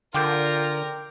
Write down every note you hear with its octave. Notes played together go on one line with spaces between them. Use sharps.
D3 F4 A#4 G5 D6 G6